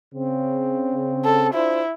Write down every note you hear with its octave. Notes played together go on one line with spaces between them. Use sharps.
C#3 C4
A4
D4 E4 F4 C5